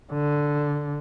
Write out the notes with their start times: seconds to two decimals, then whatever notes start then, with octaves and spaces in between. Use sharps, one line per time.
0.12 D3